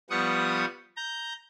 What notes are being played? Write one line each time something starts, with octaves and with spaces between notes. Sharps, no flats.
F3 G3 B3 F#5 C#6 D#6
A#5 G6